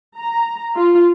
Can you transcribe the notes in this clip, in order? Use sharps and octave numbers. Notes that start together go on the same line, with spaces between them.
A#5
F4